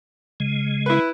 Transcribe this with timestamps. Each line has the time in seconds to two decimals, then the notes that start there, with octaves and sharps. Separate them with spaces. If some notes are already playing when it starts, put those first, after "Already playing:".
0.40 C#3 G#3
0.86 E4 B4